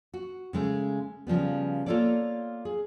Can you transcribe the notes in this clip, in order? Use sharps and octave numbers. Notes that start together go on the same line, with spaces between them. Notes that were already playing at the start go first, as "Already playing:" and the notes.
F#4
C#3 G#3 A3
C#3 F3 G3 B3
A#3 F4 A4 C#5 D5
G#4